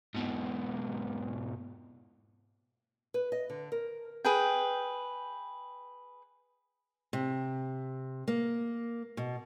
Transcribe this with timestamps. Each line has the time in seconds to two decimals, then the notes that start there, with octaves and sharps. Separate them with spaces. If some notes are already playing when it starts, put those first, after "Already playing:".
0.15 G#2 B2
3.14 B4
3.32 D#5
3.50 D3
3.72 A#4
4.25 G#4 B4 G5
7.13 C3
8.28 A#3
9.17 B2